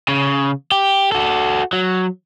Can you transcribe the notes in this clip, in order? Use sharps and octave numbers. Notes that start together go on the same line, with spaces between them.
C#3
G4
F#4 A4
F#3